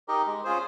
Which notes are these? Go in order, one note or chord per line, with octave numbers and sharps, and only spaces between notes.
D#4 G4 A#4 D#5
G#3
C#4 F4 G#4 C5